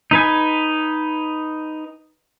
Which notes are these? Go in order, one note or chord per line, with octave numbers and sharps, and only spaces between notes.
D#4 B4 G#5